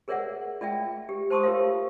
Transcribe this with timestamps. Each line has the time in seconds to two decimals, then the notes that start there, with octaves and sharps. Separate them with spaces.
0.08 G#4 A#4 C#5 D5 E5 F#5
0.61 F4 D5 E5 G5
1.09 G4
1.30 C5 A5 C6 C#6 D#6
1.43 F4 G4 A#4 C#5 E5 F5